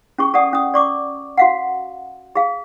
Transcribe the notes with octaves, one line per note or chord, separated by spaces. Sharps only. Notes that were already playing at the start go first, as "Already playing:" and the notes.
C#4 G#4 C#6
A4 D5 F#5 D#6
C#4 D#6
D5 C#6 D6
F#4 F5 F#5
G#4 F5